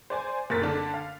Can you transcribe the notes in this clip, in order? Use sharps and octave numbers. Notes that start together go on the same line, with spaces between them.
C5 D5 G#5
F#1 A#4 A6 B6
D3 D4
F5